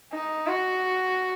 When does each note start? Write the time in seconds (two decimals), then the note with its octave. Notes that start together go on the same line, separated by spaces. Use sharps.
0.13 D#4
0.48 F#4